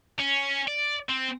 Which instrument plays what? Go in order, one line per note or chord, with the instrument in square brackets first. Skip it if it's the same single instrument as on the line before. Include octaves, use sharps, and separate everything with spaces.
[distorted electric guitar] C#4
D5
C4